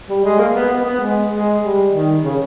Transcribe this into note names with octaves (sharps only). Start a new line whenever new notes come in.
G3
G#3
A#3
B3
B3
B3
G#3
G#3
G3
D#3
C#3